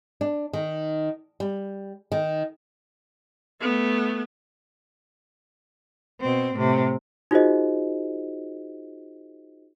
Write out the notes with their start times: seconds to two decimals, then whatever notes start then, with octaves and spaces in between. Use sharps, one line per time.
0.21 D4
0.53 D#3
1.40 G3
2.12 D#3
3.61 A3 B3
6.21 B2 C4
6.55 A2 C3
7.31 D#4 F4 F#4 G#4 C5 D#5